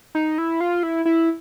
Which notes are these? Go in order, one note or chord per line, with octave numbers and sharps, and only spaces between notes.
D#4
E4
F4
E4
E4